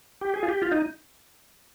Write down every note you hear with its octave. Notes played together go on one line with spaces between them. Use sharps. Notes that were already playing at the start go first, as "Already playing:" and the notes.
G4
G#4
F4
G4
F4
D#4